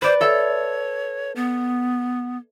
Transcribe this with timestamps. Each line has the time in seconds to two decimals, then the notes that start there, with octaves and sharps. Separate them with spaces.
0.02 B4 C5 D5
0.21 A4 C#5 E5
1.36 B3